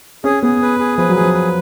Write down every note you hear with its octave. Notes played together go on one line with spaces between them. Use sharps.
C#4 G#4
B3 G#4
B4
G#4
F3 B4
F#3
G#4
F3
B4